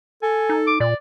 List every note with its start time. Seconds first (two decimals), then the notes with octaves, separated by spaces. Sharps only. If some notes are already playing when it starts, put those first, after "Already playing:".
0.23 A4 G#5
0.49 D#4
0.67 D6
0.80 A#2 D5